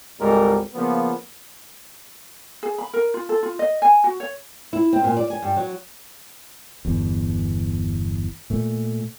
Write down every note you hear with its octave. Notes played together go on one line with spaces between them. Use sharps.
G#1 C#2 G#2 G3 A4 A#4
C#3 F3 A#3 B3
G#4
B5
A#4
F4
A4
F4
D#5
G#5
F#4
C#5
E4
C4
A#2
D5
G#5
G2
F#3
G1 E2
A#2 A3